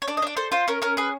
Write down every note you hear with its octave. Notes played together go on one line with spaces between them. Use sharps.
C#5
D4 D5
D#5
D4 D5
A4 C5
F4 C5
C#4 A#4
C#4 A#4
G#4 B4